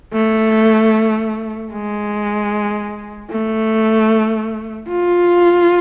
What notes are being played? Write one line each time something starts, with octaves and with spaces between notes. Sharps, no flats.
A3
G#3
A3
F4